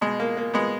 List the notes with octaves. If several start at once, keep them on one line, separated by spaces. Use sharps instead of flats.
B2 G#3
A#3
A#3
G#3 B3